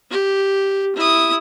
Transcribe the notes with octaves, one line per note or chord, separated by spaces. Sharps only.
G4
E4 D#6